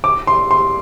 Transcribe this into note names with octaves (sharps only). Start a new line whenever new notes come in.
D6
C6
C6